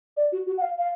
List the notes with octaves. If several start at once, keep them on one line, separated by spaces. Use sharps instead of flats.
D5
F#4
F#4
F#5
F5
F5